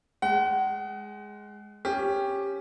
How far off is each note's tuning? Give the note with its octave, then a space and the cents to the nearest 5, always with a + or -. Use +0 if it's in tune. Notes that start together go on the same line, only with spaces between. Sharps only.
G#3 +0 F#5 +35
C#4 +0 G4 +10